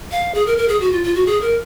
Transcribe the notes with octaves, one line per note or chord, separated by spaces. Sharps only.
F5
G#4
A#4
A#4
G#4
F#4
F4
F4
F#4
G#4
A#4